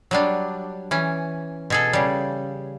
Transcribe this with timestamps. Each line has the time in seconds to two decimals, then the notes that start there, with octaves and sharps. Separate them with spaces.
0.11 F#3 G3 D4
0.91 E3 C#4
1.70 B2 G#4 A4
1.93 C#3 G3